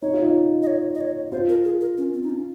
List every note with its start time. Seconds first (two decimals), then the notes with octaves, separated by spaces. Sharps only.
0.02 D#4 C#5
0.13 F4
0.23 D#4
0.62 D#5
0.67 C#5
0.95 D#5
1.01 C#5
1.32 F4 C5
1.49 A#4
1.65 G#4
1.81 A#4
1.98 C#4
2.14 C4
2.23 D#4
2.30 C#4